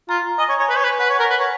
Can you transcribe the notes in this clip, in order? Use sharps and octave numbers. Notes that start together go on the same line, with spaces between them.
F4 A#5
D#5 G#5
C#5
C#5
B4
C#5
B4
B4 F#5
C#5
A#4
B4
C#5